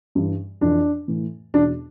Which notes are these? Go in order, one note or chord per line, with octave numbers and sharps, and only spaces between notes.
G2 E3
F2 E3 D4
A2 E3
E2 B2 D4